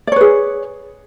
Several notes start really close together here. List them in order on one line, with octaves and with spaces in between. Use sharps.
D5 C#5 B4 G#4